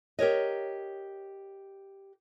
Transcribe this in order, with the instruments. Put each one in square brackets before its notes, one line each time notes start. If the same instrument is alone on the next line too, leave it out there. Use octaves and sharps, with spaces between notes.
[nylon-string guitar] G4 A#4 C#5 D#5